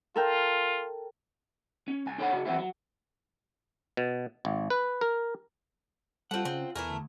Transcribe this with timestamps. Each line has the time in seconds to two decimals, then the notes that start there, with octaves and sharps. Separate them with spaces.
0.16 F4 A4 A#4 G5
1.88 C#4
2.06 C2 G#5
2.18 D4 A4 C#5 F#5 B5
2.33 C#3 F#4 G#4
2.45 E3 F#3 B3 C4 E4
2.59 F#3
3.97 B2
4.45 G#1
4.70 B4
5.01 A#4
6.31 G3 A3 C4 F4 F#5
6.45 C#3 C4
6.76 E2 E3 A3 A#4 G#5
6.90 D2